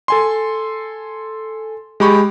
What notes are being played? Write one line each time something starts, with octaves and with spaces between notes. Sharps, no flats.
A4 G#5 C6
G#3 G4 B5 C#6